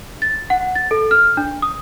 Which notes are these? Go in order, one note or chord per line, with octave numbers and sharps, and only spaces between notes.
A6
F#5
A6
A4
F6
D4
D#6